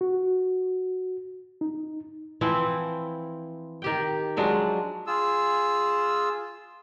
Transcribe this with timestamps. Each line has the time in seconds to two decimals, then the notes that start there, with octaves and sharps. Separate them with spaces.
0.01 F#4
1.61 D#4
2.41 E3 F3 C4 E4
3.82 D#3 G4 G5
4.37 F3 F#3 G#3 D4
5.07 F4 G#4 E6